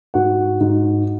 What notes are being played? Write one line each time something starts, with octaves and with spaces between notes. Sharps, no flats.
G#2 F#4 F#5
G#2